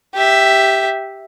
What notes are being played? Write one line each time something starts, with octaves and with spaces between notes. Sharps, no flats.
G4 E5